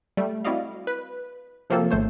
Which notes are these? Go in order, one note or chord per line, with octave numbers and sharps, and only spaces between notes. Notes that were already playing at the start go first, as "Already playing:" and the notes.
G3 A3
C4 E4 F#4 D5 D#5 F5
B4
C3 F3 F#3 A#3 C4 A4
G#1 A3 C5 C#5